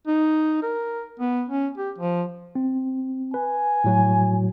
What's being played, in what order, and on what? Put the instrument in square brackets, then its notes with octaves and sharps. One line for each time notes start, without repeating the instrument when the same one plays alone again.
[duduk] D#4
A#4
B3
C#4
G4
F3
[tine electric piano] C4
[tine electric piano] B4 [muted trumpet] G#5
[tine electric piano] A2 F#3 F#4